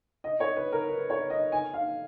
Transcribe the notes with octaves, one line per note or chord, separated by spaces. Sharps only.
D#5
C#5
B4
A#4
B4
C#5
D#5
G#5
F5